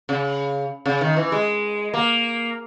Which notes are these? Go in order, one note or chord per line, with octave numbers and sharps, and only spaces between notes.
C#3
C#3
D#3
E3
G#3
A#3